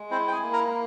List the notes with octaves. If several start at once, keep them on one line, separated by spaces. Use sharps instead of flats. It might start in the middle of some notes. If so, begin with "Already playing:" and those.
Already playing: G#3
C4 E4 C5
G5
G#4 G#5
A#3
A#4 A#5